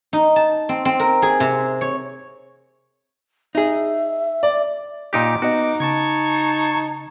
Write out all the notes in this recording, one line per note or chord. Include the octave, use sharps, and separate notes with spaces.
D#4
A5
C4
C4
A#4
G#4
C3
C#5
D#4 G#4 E5
D5
A#2 D#4 G4 D6
B3 D#4 F#4 D#5
C#3 A5 C#6 G#6